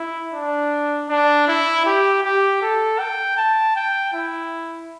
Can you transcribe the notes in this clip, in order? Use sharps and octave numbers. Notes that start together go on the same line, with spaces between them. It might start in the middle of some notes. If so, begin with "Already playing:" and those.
Already playing: E4
D4
D4
E4
G4
G4
A4
G5
A5
G5
E4